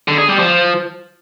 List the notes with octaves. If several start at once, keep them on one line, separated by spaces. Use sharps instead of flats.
D3
G#4
G3
F3